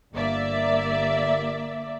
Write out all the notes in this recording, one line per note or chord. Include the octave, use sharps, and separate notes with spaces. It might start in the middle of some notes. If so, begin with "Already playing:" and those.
G1 A#3 D5 E5